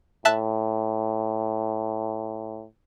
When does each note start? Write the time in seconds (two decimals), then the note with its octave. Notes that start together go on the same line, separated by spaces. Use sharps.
0.25 A2 E5 A5 F#6